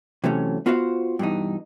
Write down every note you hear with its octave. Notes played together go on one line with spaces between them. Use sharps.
C3 E3 F#3 A3 C#4
B3 F4 F#4 C5 D5 F5
G2 B2 E3 D#4